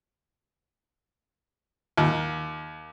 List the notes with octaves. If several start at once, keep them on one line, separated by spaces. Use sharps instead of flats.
D#2